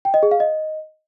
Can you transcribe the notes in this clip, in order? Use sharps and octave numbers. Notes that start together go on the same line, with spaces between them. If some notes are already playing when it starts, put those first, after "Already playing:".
G5
D#5
G#4
F5
D#5